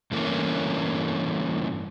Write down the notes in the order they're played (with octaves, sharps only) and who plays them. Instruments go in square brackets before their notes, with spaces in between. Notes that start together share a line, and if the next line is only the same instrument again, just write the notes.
[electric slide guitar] G2 E3 A3 A#3 C#4